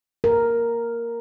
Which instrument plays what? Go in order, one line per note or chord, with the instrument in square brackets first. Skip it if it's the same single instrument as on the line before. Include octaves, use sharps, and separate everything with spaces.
[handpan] A#4